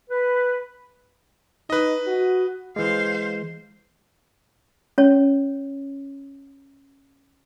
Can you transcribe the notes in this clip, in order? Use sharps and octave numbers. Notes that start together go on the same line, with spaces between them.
B4
D#4 B4 D#5
F#4
E3 G#3 C5 F5
C#4 C#5